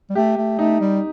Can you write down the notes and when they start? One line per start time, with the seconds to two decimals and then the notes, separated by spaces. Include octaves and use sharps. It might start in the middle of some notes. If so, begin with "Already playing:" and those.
0.10 G3
0.15 A3 G4
0.37 A3
0.59 A3 D#4
0.81 G3